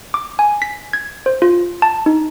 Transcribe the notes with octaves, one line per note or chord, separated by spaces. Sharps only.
D6
G#5
B6
G#6
C5
F4
A5
D#4